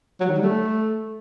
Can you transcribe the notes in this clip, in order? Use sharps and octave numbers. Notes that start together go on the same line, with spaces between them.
F#3
D#3
G3
A3